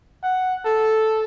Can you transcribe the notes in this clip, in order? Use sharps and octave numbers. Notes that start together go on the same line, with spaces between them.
F#5
A4